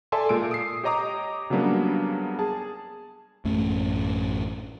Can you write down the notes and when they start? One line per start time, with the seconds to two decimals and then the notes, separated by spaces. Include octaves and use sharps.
0.12 A4 D5 E5 G#5 A5 C6
0.29 A#2 G#3 E6 D7
0.51 D#6 C7
0.84 G4 C#5 D#5 A#5 D6 D#6
1.50 C#3 F#3 G3 A#3 B3 D4
2.39 G#4 A5
3.45 A1 F#2 A3 C#4